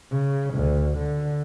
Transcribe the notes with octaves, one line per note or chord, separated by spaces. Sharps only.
C#3
D2
D3